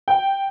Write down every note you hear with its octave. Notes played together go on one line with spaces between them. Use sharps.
G5